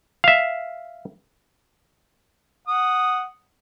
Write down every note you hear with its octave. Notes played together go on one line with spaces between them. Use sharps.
E5 F5
F#5 D#6